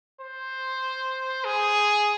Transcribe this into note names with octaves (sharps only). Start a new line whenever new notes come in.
C5
G#4